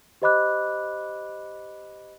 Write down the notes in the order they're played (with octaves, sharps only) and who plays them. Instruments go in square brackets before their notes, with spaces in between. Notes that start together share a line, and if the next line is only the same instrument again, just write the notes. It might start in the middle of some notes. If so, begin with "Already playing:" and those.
[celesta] G4 C5 D#5 B5 D6 F#6